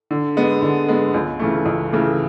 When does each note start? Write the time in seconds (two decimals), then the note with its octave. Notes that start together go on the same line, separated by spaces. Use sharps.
0.11 D3
0.37 G#3 B3
0.62 D3
0.88 G#3 B3
1.14 C#2
1.39 C#3 E3 A3
1.66 C#2
1.92 C#3 E3 A3